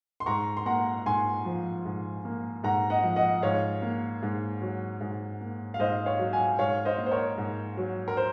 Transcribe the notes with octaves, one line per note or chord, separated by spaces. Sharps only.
C6
G#2 A#5 C#6
C6
A#3 F#5 A#5
G#2 G#5 C6
F3
G#2
A#3
G#2 F#5 A#5
D#5 F#5
F3
D#5 F#5
G#2 C#5 F5
A#3
G#2
F#3
G#2
A#3
F5
G#2 C5 D#5
C#5 F5
F#3
F5 G#5
G#2 C#5 F5
C5 D#5
A#3
C5
A#4 C#5
G#2
F#3
A#4
C5